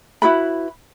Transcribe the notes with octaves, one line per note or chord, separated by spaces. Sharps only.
E4 F#4 B4 B5